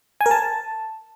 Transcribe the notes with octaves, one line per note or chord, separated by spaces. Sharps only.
G#5
A#4
A5